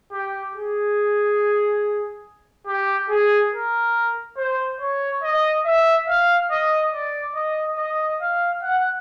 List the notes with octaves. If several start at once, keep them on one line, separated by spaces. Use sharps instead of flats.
G4
G#4
G4
G#4
A#4
C5
C#5
D#5
E5
F5
D#5
D5
D#5
D#5
F5
F#5